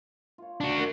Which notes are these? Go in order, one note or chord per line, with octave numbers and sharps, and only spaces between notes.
F4 C#5
D4 F#4
F#2